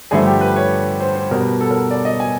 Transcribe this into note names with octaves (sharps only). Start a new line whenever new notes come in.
G2 D3 F3 A3 G#4
G4
B4
C#5
C5
C5
B2 G3 B3 A#4
A4
A#4
D5
D#5
G#5